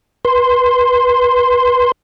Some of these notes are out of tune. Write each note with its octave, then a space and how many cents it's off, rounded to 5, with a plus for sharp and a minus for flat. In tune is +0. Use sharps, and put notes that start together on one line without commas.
B4 -15 C6 +0